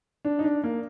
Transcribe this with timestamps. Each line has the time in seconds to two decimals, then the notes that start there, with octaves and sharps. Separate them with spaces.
0.25 D4
0.39 D#4
0.44 D4
0.64 A#3